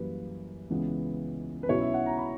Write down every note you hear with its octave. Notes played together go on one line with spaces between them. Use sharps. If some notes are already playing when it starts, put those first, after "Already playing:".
Already playing: F#2 E3 G3 A#3 B4
C#2 C#3 E3 B3
B4
B1 B2 F#3 C#4 E4 C#5
E5
F#5
A#5
B5